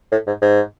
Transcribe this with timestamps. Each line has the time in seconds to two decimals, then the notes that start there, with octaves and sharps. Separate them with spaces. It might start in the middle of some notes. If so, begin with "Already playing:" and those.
0.12 A2
0.27 G#2
0.42 G#2